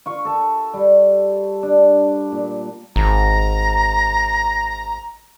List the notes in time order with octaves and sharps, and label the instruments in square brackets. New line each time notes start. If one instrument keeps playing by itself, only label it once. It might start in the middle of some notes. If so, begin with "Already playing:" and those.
[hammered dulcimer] F4 C#6
A4 A5
G3
D4
A#2
[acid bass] G#1 [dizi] A#5